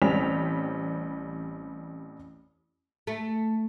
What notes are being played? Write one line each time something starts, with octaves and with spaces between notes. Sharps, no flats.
A1 G3 C4 B6 F7
A3